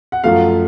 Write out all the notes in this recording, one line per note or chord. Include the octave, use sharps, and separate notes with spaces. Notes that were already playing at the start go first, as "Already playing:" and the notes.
F#5
F#2 F3 A3 F5